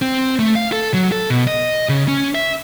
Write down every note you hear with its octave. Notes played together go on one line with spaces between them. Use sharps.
C4
A3
F5
A4
F#3
A4
B2
D#5
C#3
C#4
E5